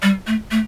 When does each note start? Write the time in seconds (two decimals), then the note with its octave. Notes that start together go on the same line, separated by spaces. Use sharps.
0.03 G3
0.27 A3
0.51 A3